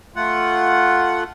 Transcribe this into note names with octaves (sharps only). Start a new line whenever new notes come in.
A3 F4 F#5